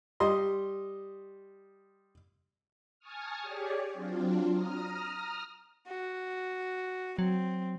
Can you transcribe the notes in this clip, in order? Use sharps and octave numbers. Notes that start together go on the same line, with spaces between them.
G3 D#5 C6
G#5 A5 C#6 D#6 F6
G4 G#4 C#5 D5
F#3 C4 D4 F4
A#5 D#6 F6
F#4
F#3 C4